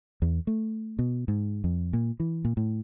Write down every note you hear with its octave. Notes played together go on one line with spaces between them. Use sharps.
E2
A3
B2
G#2
F2
A#2
E3
A#2
A2